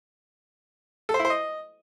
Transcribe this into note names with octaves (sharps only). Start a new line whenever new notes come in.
A4
C5
E4
C5
D#5